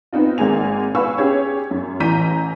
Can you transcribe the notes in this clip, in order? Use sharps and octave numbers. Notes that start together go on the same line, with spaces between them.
B3 C4 D#4 F4
G#1 G#3 A#3 G#5 F7
B4 F5 G#5 B5 C#6 E6
C#4 G4 G#4 C#5
F#2
A1 E3 A#5 G6 B6 D#7